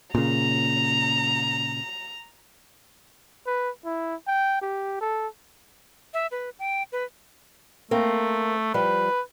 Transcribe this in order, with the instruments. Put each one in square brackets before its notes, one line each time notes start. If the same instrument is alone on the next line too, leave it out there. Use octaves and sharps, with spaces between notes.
[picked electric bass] A#2 C#3 [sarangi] A#5
[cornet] B4
E4
G5
G4
A4
[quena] E5
B4
G5
B4
[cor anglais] A3 [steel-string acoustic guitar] A#3 C4
[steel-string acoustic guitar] F3 G3 [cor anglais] B4